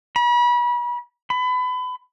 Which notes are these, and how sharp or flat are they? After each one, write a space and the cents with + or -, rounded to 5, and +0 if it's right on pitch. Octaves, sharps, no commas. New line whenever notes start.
B5 -35
B5 +30